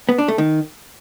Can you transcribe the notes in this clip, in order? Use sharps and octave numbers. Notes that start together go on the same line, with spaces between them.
B3
D4
A3
D#3